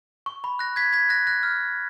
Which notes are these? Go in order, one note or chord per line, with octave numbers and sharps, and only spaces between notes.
C#6
B5
F#6 A#6
G#6 B6
G#6 B6
F#6 A#6
F#6 A#6
F6